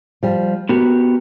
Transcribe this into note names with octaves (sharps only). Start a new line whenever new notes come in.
F3 G3
B3 F#4 G4 A#4